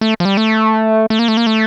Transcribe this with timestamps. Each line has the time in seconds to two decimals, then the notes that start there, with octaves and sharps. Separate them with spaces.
0.01 A3
0.20 F3
0.25 G3
0.37 A3
1.10 A3
1.19 A#3
1.28 A3
1.37 A#3
1.47 A3